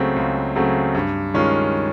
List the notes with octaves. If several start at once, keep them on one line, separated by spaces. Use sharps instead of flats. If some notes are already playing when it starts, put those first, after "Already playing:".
Already playing: C#2 C#3 F#3 A3 C4
C#2
C#3 F#3 A3 C4
G2
D#3 G#3 C#4 F4